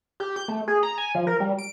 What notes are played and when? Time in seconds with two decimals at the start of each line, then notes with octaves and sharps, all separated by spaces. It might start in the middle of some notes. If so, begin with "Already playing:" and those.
0.20 G4
0.36 G6
0.48 A3
0.68 G#4
0.83 A#5
0.98 G#5
1.15 F3
1.27 A#4
1.40 G3
1.59 D7